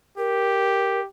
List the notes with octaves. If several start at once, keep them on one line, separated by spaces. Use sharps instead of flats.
G4 A#4